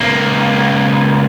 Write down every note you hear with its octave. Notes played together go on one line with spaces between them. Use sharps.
C#2 A#3